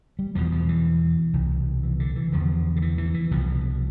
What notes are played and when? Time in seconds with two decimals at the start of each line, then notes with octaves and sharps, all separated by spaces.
0.19 G3
0.35 E2 B2 F3
0.52 F3
0.69 E3
1.33 C2 B2
1.83 E3
2.00 D3
2.16 E3
2.32 E2 D3 F3
2.76 D3
2.82 E3
2.98 E3
3.14 E3
3.31 C2 B2 F3